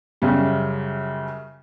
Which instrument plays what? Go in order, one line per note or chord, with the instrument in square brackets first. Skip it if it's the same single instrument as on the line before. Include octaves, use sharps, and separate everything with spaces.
[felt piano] F#2 C#3 G3